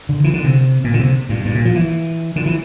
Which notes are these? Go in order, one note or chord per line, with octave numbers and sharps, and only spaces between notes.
D3
E3
D3
C3
A#2
D3
C3
G2
G2
A#2
F3
E3
D3
E3